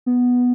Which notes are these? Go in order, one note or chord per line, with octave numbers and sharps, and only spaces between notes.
B3